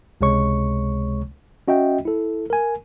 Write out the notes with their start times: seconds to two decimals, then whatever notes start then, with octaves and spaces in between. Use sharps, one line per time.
0.21 C#2 C3 G#3 C#5 C#6
1.68 C#4 F#4 D#5 E5 G5
2.05 E4 A4
2.50 A#4 G#5